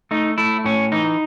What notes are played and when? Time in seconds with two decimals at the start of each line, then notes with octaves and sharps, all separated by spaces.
0.11 A3 D#4
0.38 A3 E4
0.65 A2 C#4
0.92 E3 D#4